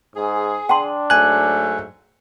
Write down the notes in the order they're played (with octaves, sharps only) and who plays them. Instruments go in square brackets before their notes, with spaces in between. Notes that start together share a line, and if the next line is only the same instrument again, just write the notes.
[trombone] G#2 [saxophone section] G#4
[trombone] D4 [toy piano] G5 A5 C6
[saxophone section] G#2 F#3 A3 [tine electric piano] G#5 F#6